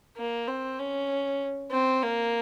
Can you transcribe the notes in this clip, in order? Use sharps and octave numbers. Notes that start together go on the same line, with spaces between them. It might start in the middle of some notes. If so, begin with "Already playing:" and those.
A#3
C4
C#4
C4
A#3